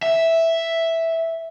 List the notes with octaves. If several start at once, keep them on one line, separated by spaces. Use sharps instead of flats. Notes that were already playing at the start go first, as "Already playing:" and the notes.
E5